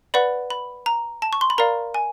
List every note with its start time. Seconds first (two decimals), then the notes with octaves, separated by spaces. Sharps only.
0.14 B4 D5 F#5 B5
0.50 B5
0.86 A#5
1.22 A5
1.33 C#6
1.41 C6
1.50 B5
1.58 A#4 D5 F5 A#5
1.94 G#5